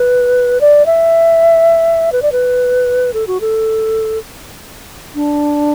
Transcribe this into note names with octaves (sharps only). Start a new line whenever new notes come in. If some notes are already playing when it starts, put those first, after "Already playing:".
Already playing: B4
D5
E5
B4
D5
B4
A4
F#4
A4
D4